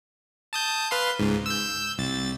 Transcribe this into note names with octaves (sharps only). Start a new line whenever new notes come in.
A5 D#6 G6
B4 F5 C6
C#2 G#2
E6 G6
C2 A6